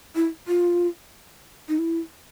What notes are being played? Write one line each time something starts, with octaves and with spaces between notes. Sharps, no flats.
E4
F4
D#4
E4